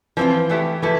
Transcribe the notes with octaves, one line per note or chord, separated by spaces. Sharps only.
E3 F3 C4 F4
E3 A3 E4 G4
E3 F3 A3 E4 A4